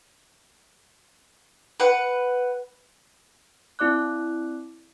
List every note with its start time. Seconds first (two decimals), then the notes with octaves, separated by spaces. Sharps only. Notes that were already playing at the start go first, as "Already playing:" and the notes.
1.80 B4 F#5
3.79 C4 E4 D5 D6 F#6